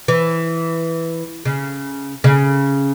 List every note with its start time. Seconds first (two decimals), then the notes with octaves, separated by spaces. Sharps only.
0.08 E3
1.45 C#3
2.24 C#3